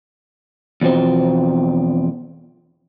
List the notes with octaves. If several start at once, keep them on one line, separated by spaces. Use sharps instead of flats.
E2 B2 F3 C4